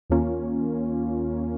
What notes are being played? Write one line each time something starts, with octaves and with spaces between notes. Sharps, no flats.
D#2 D#3 A#3 C#4 F4